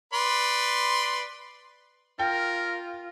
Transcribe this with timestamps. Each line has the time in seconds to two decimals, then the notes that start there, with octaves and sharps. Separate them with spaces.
0.13 B4 D5 C6
2.19 F4 A#4 G5